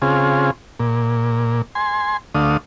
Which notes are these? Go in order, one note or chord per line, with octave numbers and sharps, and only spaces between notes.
C#3 C4 F4 G#4
A#2
G#5 C6
D2 D3 A3 F5 D#6